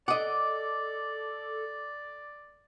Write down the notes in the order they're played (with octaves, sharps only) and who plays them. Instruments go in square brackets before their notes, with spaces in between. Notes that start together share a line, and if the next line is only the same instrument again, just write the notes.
[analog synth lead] A4 [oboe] D5 [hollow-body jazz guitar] D#5 F#5 [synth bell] D6